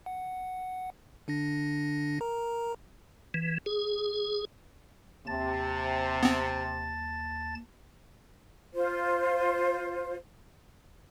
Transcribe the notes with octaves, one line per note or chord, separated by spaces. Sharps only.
F#5
D3 D4 A#6
A#4 A#5
E3
G#4
D#2 C3 A5 A6
B3 C4
F4 C5